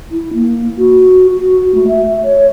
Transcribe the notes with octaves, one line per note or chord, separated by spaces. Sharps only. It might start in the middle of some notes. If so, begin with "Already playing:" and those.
E4
A#3
F#4
F#4
A3
E5
C#5